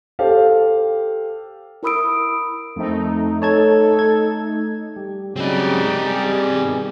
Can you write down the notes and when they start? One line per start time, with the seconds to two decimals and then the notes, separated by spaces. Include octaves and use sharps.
0.19 G4 A4 C5 F5
1.83 E4 A#4 B5 D#6 E6 D7
2.76 F2 A3 C4 D#4
3.42 A4 C#5 A5 G#6
3.99 G#6
4.96 G3
5.36 C#3 F#3 G#3 C4 D#4 G4 D5 D#5
6.07 G3 G#4
6.47 B2 D#3